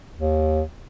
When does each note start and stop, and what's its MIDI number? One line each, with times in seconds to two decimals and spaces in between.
0.17 0.62 39